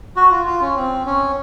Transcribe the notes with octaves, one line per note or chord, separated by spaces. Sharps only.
F#4
F4
F4
C#4
C4
C#4